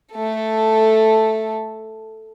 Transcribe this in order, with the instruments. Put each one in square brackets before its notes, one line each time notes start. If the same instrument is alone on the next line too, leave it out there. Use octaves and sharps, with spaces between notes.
[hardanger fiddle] A3 A4